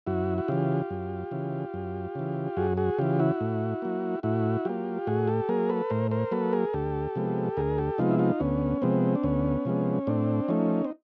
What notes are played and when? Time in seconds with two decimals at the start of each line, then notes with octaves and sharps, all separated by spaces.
0.07 F#2 E4 F#4
0.38 F#4
0.48 C#3 E3 F4 G4
0.90 F#2
1.31 C#3 E3
1.74 F#2
2.15 C#3 E3
2.57 F#2 F#4 G#4
2.77 F#4 G#4
2.98 C#3 E3 F4 G4
3.19 E4 F#4
3.41 A2
3.82 F#3 A#3
4.23 A2 E4 F#4
4.65 F#3 A#3 F4 G4
5.07 A2 F#4 G#4
5.28 G4 A4
5.49 F#3 A#3 G#4 A#4
5.69 A4 B4
5.90 A2 A#4 C5
6.11 A#4 C5
6.32 F#3 A#3 A4 B4
6.53 G#4 A#4
6.73 D2 G4 A4
7.16 C3 F3 G#3 B3
7.57 D2 G#4 A#4
7.78 G4 A4
7.98 C3 F3 G#3 B3 D#4 F4
8.10 E4
8.19 D#4 F4
8.40 D2 B3 C#4
8.82 C3 F3 G#3 B3 C4
9.15 D4
9.23 D2 B3 C#4
9.65 C3 F3 G#3 B3
10.07 A2 C4 D4
10.48 F3 A3 C#4 D#4
10.84 C4